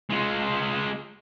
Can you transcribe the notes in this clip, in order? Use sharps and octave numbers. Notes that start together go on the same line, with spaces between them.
G#3 F4